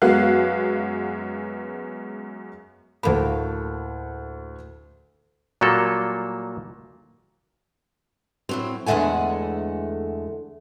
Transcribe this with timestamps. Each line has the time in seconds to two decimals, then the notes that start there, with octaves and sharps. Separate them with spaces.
0.02 F#2 G#3 B3 F5 F#6
3.03 D2 A2 A#3 A4 B5
5.61 A#2 F#3 G3 A#3 A4
8.49 A2 F#3 C4
8.86 E2 D3 G#3 A3 F#5 G#5